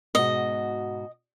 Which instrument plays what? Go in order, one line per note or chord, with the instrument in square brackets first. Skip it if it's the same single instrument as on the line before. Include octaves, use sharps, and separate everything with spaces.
[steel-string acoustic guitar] G#2 B2 F#4 [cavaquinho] D#5